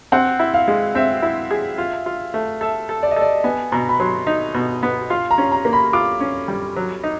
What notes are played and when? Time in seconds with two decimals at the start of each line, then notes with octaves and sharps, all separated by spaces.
0.12 C4 F#5
0.39 E4
0.54 F5
0.68 G#3
0.95 C4 E5
1.22 E4
1.51 G#4
1.78 F4
2.06 F4
2.34 A3
2.61 A4 E5
2.89 A4
3.03 D5
3.11 D#5
3.16 A4 D5
3.44 B3 G#5
3.72 B2 A#5
3.89 B5
4.00 F#3 C6
4.27 D#4
4.54 B2
4.83 B3
5.10 F4 C6
5.31 A#5
5.38 C#4
5.52 A#5
5.65 A#3
5.73 B5
5.93 F4 D6
6.21 C#4
6.48 G3
6.76 F#3
7.03 D#4